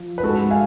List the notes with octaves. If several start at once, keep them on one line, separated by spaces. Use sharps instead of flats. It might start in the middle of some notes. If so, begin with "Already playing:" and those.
Already playing: F3
B4
G#2 G#3 F#4 A4
F5 G#5